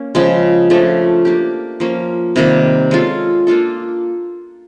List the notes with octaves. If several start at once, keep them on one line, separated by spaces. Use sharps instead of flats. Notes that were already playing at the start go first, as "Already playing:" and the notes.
Already playing: A#3 C#4
C#3 F3 G#3
C#3 F3 A3 D4
A#3 D4 G4
F3 A#3 C#4
C3 D#3 G3 A#3
G#3 C#4 F4 A4
A#3 D4 F4 A4